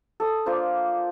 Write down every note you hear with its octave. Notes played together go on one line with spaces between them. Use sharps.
A4 D#6
A#3 D4 F4 C5